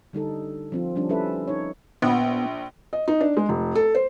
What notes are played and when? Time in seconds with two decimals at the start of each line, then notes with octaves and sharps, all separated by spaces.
0.13 D3 G3 D#4 A4
0.72 F3 C4 F4
0.96 F3 G3 C#4 D4
1.09 G3 C#4 E4 A4 B4 E5
1.48 D#4 C#5
2.02 A#1 B3
2.93 D#5
3.08 D#4
3.21 D4
3.37 G#3
3.49 F1
3.75 A4
3.95 C5